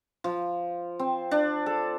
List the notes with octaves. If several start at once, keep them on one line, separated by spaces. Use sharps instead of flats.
F3
C4
D4
A4